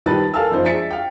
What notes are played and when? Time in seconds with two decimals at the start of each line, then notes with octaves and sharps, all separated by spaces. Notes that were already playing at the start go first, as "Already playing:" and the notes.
0.06 D#3 G3 B4 A5 A6
0.34 A4 A#4 F5 G#5 A5 E6
0.50 F#1 F3 D#4 C5
0.64 D4 G#4 E5 A6 B6 C#7
0.91 F5 G5